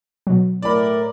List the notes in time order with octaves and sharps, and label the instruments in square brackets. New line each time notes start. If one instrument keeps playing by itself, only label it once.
[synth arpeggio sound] B2 F#3
[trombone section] A2 A#4 [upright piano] D5 B5